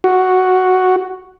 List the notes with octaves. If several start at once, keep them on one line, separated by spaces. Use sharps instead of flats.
F#4